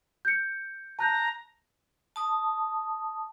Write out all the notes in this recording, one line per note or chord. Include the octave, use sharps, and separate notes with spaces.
G6 C#7
A5 A#5 F#6 G6
A5 D#6